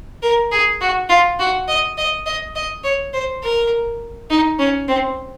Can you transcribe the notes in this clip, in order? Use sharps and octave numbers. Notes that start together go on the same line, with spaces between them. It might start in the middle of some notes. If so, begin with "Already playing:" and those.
A#4
G#4
F#4
F4
F#4
D#5
D#5
D#5
D#5
C#5
C5
A#4
D#4
C#4
C4